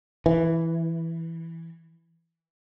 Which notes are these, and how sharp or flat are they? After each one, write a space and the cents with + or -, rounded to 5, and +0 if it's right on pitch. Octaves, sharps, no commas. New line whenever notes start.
E3 +0